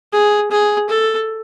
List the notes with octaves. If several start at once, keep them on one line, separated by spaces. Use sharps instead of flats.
G#4
G#4
A4